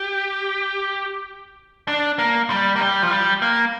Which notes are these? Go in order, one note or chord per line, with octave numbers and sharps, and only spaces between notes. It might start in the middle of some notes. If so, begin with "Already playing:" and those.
Already playing: G4
D4
A#3
G3
A#3
G3
F3
G3
A#3